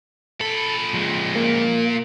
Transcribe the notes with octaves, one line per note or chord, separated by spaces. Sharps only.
A#2 A4 B5
F3 G#3
A#3